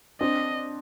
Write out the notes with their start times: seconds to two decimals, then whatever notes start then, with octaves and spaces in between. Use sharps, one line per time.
0.21 C4 D4 D#5